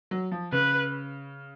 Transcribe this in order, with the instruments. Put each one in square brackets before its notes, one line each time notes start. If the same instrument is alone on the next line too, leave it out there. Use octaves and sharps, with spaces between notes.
[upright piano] F#3
F3
[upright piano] C#3 [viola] B4